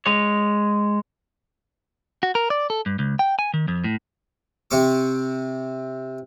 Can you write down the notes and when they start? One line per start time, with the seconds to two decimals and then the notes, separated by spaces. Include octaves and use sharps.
0.06 G#3 C#5
2.23 F#4
2.35 A#4
2.50 D5
2.70 A4
2.86 G2
2.99 C#2
3.19 G5
3.39 G#5
3.54 D#3
3.68 F2
3.84 A2
4.71 C3 C4 C#6 D6